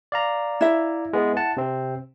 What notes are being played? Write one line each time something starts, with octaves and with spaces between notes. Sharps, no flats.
D5 F5 A#5
E4 E5
G#3 B3
F#5 A5
C3 C4